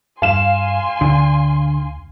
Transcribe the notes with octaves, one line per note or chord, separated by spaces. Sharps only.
G2 F5 G#5 C6 E7
D2 D3